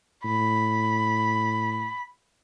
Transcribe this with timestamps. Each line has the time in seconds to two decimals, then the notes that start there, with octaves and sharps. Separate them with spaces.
0.25 A2 B5